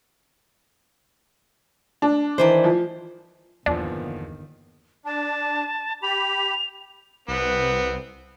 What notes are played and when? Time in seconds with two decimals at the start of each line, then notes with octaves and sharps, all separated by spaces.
2.02 D4
2.38 D#3 E3 C5
2.64 F3
3.66 G1 E2 A#2 D#3 F3 B3 D4
5.05 D4 A5
6.03 G4 B5 F7
7.28 C2 B3 C4 B4